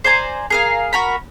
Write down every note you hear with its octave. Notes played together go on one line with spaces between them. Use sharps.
C5 D5 G#5 A#5
G#4 A#4 F5
F#4 A#4 B5